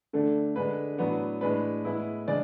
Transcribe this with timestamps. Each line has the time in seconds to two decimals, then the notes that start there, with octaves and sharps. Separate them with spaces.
0.13 D3 A3 D4
0.55 D3 G#3 D4 B4
0.98 A2 F#3 B3 D4
1.41 A2 G#3 D4 B4
1.85 A2 G#3 B3 E4
2.27 C#3 G#3 D4 D5